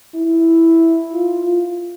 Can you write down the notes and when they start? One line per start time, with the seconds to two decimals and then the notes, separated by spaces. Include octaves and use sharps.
0.14 E4
1.14 F4